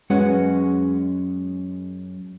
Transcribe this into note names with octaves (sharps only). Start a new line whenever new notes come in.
F#2 G#3 C#4 F#4 B4 F#5